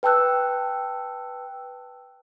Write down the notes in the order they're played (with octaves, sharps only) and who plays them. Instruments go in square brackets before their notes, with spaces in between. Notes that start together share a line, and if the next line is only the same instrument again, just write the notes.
[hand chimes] B4 G5 A5 E6 F#6